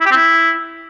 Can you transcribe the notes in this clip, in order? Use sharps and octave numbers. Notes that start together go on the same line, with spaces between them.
E4
G4
C4
E4